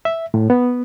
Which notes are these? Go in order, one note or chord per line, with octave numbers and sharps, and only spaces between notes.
E5
A2
B3